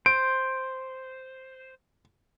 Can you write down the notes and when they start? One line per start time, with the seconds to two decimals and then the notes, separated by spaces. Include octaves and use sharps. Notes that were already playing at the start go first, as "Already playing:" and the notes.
0.06 C5 D7